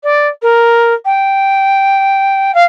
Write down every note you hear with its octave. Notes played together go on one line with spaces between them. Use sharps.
D5
A#4
G5
F5